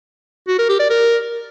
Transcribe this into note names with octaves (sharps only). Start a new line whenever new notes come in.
F#4
A#4
G4
D5
A#4